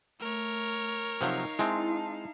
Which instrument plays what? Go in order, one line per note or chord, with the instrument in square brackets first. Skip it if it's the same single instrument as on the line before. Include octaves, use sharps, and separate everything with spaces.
[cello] A3 [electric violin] A#4 C#5
[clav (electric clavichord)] C3 F3 F#3 [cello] D#4 F5
[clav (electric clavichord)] G#3 C4 [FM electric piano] E4 A5